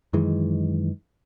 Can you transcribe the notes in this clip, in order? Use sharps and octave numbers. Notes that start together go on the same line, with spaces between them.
F#2 D#3 E3 G#3